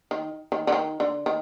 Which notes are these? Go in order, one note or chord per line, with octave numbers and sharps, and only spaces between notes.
D#3
D#3
D3
D#3
D3
D#3